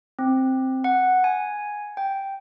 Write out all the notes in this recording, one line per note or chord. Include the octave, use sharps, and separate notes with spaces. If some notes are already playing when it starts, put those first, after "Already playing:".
C4
F#5
G#5
G5